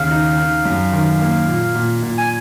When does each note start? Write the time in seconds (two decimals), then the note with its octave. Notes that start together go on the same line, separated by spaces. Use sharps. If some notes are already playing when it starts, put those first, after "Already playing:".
Already playing: D#2 C#3 F5
0.11 D#4
0.37 D#3
0.65 F#2
0.92 D#3
1.21 A#3
1.47 A#2
1.75 A#2
2.02 A#2
2.18 G#5